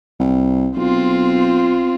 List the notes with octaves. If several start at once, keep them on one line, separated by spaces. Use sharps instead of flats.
C2
B1 C4 F4